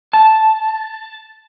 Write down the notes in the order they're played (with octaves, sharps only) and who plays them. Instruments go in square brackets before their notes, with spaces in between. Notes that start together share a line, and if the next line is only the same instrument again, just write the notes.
[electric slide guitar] A5